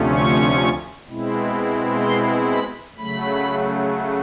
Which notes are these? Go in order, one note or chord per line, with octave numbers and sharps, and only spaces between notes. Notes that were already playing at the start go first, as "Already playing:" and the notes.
Already playing: D2 C3 F3 A3 C#4
C#6
B2 G#3 C4 E4
C6
B5
C#3 F#3 A3 B5